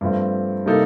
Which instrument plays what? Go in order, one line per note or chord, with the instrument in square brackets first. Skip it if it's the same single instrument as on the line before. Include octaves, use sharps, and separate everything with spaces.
[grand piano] G2 F3 A3 C4
C3 G3 A#3 D#4 A4